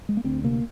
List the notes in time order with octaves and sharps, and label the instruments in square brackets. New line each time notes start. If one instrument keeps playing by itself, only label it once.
[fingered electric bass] G#3
A#3
D2 C4
C3 A#3